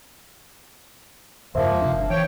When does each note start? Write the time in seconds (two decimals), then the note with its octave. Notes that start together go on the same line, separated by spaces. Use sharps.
1.55 E2 G2 C#3 F3 A#3 C5 E5
1.70 G#3
1.81 C3 D4
1.93 F#1
2.10 E3 C#5 G5